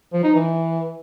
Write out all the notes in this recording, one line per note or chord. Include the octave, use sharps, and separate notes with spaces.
F3
D#4
E3